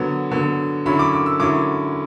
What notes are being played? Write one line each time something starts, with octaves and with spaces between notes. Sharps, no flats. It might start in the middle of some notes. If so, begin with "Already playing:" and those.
Already playing: D3 F#3 B3
D3 F#3 B3
D3 F#3 C#4 E4 B5
D6
D6
E6
D3 F#3 C#4 E4 D6